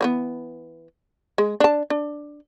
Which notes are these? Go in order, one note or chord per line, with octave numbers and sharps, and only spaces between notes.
E3 F#3 B3
G#3
D4 A5
D4